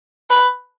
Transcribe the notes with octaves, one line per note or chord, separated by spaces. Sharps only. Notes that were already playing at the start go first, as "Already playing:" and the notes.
B4